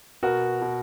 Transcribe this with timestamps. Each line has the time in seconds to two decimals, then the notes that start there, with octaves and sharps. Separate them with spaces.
0.23 B2 F#4 A#4
0.62 B2